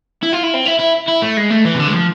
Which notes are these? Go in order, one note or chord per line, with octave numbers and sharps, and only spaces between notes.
E4
F4
E4
C4
E4
E4
E4
A3
G#3
A3
E3
C3
D3
G#3
F3